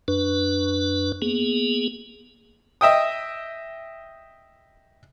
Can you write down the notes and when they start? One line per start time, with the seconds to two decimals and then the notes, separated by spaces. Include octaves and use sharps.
0.08 F#2 D4 B4
1.22 A#3 B3 G#4
2.81 D#5 E5 G5 D#6